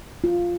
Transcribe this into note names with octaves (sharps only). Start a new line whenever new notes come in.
F4